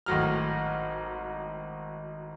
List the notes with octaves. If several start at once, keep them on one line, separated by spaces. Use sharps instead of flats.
G#1 A2 F#3 F6